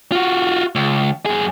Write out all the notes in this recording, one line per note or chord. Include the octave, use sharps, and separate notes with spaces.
F4 F#4
C#2
F#2 G#4